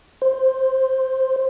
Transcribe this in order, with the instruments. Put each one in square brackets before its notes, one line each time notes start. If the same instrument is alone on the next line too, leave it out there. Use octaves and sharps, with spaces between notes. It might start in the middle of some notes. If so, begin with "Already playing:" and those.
[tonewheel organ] C5